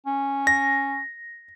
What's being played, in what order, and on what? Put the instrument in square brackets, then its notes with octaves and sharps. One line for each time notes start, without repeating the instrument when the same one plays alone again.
[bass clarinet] C#4
[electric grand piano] A#6